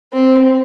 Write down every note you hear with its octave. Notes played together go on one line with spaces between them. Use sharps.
C4